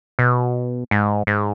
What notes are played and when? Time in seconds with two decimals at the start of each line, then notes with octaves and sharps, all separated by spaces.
0.19 B2
0.91 G#2
1.27 G#2